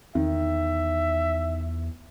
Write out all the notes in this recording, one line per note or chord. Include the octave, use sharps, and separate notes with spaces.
E2 D#3 E5